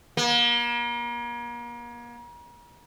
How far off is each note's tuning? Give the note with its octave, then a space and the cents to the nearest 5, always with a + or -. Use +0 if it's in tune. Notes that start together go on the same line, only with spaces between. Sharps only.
A#3 +40